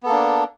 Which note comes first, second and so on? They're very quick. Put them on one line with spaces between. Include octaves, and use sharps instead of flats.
B3 A4 A#3 D4